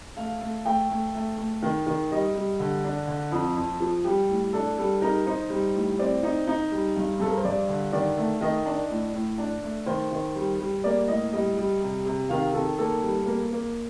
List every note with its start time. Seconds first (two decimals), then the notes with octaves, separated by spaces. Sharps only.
0.17 A3 F5
0.41 A3
0.65 A3 G5
0.89 A3
1.14 A3
1.38 A3
1.62 D#3
1.87 D#3
2.11 G3 D#5
2.35 G3
2.60 D3
2.84 D4
3.07 D3
3.32 F2
3.57 F2
3.80 F3
4.04 G3 G4
4.29 A2
4.53 D4 A4
4.78 G3 A4
5.02 D#4 A#4
5.26 D#4 C5
5.50 G3
5.75 A2
5.99 C4 D5
6.23 D#4
6.47 D#4
6.72 G3
6.96 G2
7.20 G2 A4
7.28 A#4
7.37 C5
7.45 G2 D5
7.69 D3
7.92 D#3 D5
8.17 A3
8.41 D#3 D#5
8.66 D4
8.90 A2
9.14 A2
9.38 D4
9.63 A3
9.86 D#3 C5
10.11 D#3
10.35 G3
10.60 G3
10.84 A#3 D5
11.08 A2 D#5
11.32 G3 D#5
11.57 G3
11.81 C3
12.05 C3
12.29 D#3 F5
12.54 D#3 A4
12.78 A#3 A4
13.02 G3
13.26 A#3
13.51 A#3